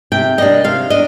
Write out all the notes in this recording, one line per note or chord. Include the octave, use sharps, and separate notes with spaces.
C3 G5
G3 A#3 D4 D#5
C3 F5
D4 D#5